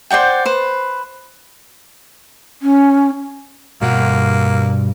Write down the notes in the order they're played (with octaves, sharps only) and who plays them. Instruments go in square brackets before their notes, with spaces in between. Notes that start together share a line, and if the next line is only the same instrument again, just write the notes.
[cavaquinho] C5 D5 F#5 G5
B4 C5
[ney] C#4
[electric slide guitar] G2 F#5 [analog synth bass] B2 [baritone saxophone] A#3